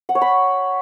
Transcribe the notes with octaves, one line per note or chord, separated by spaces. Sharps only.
F#5
C#5
B5